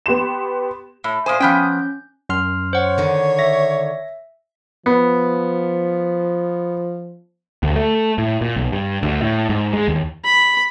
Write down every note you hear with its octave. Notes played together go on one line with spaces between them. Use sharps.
B3 G4 C6 E7
A2
A#2 C5 G#5 D#6
F3 B3 C#4 G5 G6
F#2 C6 F6
C5 C#5 F#5
D3 D#3
E5 A#6
F3 B3
D2
A3
A2
A#2
B1
G2
D2
A2
G#2
G#3
D#2
B5